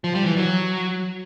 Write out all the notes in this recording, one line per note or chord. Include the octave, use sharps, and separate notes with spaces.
F3
G3
E3
F#3